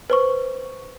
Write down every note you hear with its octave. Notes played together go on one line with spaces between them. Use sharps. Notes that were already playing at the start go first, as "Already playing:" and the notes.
B4 C5 C#6